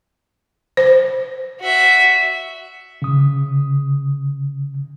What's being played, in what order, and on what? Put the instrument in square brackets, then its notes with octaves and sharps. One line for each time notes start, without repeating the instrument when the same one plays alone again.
[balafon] C5
[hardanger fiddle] F#4 E5
[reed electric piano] C#3 D#6